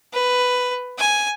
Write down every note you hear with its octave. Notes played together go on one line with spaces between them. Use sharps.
B4
G#5